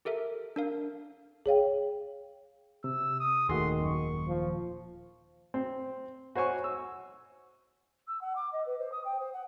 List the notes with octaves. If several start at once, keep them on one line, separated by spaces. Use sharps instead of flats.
G4 A4 A#4 E5
D4 A#4 F5
G#4 C#5 F5 G5
C3 E6
D#6
D#1 D#2 D#3 A3 F#4 G#4 C6
F#2 C#6
F3
C4
F#4 C5 C#5 G#5 C#6
E6
E6
F#5
D6
D#5
B4
C5
D#6
G5
C5
F#5